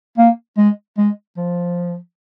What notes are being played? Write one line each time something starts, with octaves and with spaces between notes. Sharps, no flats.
A#3
G#3
G#3
F3